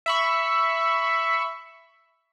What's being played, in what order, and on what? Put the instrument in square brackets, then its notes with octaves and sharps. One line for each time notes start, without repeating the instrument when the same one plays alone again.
[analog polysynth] E5 B5 C#6